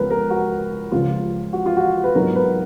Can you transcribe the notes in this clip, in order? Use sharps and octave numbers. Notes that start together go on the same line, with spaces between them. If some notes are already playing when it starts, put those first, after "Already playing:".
Already playing: C#2 C#3 F3 B3 A#4 B4
A#4
F#4
C#2 C#3 F3 F4
F#4
F4
F#4
B4
G#2 F#3 B3 D#4 A#4
B4